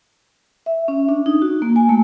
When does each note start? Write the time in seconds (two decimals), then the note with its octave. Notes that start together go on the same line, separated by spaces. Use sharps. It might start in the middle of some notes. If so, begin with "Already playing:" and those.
0.66 E5
0.88 C#4
1.09 D4
1.26 D#4
1.42 F#4
1.62 A#3
1.76 G#5
1.89 A3